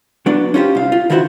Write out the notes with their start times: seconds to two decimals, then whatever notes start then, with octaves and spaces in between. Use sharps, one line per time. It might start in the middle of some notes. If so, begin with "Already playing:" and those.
0.26 F#3 B3 D4 D5
0.54 C#4 D#4 F4 G4 A#4 C5
0.75 C2 F5
0.92 F4
1.10 D3 D#3 E4 F#4 B4 C5